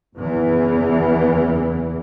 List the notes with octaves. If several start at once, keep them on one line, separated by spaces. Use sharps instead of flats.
F#1 E2 E3